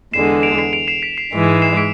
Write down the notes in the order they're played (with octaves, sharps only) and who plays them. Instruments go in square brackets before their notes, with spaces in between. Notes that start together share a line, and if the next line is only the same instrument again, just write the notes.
[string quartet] E2 D3 G#3 [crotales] C7 E7
[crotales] D7 F7
C7 E7
D7 F7
C7 E7
B6 D7
C7 E7
[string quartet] G#2 E3 G#3
[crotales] C7 E7
B6 D7